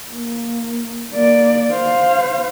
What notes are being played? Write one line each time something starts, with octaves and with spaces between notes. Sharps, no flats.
A#3
A#3 D5
C5 F5